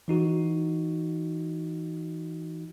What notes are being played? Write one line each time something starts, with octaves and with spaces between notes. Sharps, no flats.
E3 D#4 F#4